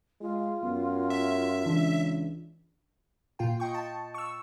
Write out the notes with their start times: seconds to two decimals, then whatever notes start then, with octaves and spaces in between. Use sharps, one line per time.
0.21 G#3 F4
0.63 F#2 B3
1.10 E5
1.66 C#2 E3 D4
3.39 A#2 F4 G5
3.60 D#5 G5 C#6
3.74 A5
4.14 C#6 E6